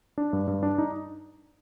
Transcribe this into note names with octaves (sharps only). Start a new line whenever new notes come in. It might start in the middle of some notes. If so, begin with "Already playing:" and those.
D4
G2
G2
D4
D#4